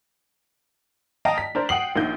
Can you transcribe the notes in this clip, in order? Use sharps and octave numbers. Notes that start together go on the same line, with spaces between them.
D#5 F5 G5 A5 A#5 D#6
B6
D4 A#4 C5
F#5 G5 D#6 C7 F#7
A#1 A#3 D#4 G6